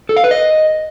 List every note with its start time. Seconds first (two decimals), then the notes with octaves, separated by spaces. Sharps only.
0.09 A4
0.17 F5
0.24 B4
0.31 D#5